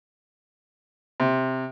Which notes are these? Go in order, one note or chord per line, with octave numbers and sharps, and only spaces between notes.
C3